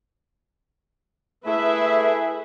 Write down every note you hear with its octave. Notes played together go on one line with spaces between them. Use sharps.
A3 E4 G#4 B4 E5